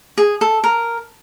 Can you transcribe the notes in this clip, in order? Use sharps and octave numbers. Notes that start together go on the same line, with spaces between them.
G#4
A4
A#4